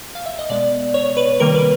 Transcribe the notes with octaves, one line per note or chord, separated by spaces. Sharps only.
F5
E5
D#5
B2 G#3 B3 D5
C#5
B4
C3 D#3 G3 A#3 A#4
B4